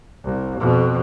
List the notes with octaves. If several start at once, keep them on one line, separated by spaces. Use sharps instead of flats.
C2
F2 B2